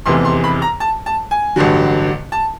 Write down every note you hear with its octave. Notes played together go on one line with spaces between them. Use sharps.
F1 E2 C3 E3 C6
C6
B5
A#5
A5
A5
G#5
A1 G2 D3 F#3
A5